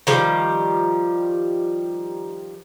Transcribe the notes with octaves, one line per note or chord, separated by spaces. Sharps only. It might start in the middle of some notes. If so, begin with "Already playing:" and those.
D#3 F3 G3